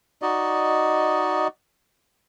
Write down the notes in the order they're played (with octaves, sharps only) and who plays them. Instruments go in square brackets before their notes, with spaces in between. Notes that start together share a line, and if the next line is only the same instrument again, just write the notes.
[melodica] D#4 F#4 D5 D#5